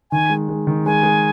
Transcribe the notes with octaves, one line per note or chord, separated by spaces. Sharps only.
D#3 G#5
G#3
G#3
D#3
G#3 G#5
G#3